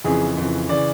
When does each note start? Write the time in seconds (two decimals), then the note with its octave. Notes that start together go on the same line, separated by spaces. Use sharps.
0.04 F2 C#3 E3 G#4
0.37 F2 C#3 E3
0.69 C#3 E3 D5